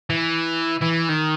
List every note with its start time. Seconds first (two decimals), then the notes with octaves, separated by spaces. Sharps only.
0.10 E3
0.82 E3
1.09 D#3